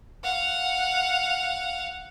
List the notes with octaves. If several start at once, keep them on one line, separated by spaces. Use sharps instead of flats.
F5 F#5